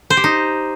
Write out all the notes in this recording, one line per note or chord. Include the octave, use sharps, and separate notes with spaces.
C5
G4
D#4